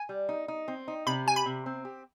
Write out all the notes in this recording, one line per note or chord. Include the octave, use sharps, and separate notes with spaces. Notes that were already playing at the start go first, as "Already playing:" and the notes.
Already playing: G#5
G3
D#4
D#4
C4
D#4
C3 B5
G4 G#5
B5
C3
C4
G4